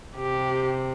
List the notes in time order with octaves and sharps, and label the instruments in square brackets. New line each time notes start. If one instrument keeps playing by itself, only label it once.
[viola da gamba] C3 [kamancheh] G4